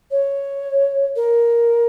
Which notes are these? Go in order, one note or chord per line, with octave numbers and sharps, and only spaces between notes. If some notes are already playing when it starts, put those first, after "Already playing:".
C#5
A#4